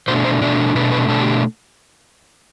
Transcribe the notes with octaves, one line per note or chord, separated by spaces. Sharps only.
B2 A3 D4 C5
C5
B2 A3 D4 D5
B2 A3 D4 B4
B4
B2 A3 D4 A4
G4